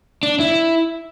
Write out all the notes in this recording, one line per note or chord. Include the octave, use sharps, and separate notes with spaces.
D4
E4